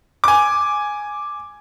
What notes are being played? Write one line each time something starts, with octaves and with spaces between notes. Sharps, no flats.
G#5 D6